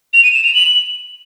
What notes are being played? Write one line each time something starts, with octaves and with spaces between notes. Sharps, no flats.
F7
D#7
E7
F7
F#7